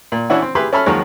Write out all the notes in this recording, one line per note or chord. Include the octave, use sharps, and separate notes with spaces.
A#2
E3 C#4 D4 E4 F#4
C4
G4 G#4 B4 E5 B5 C6
C#4 A4 E5 B5 F6
D#2 D#3 F3 F#3 G#3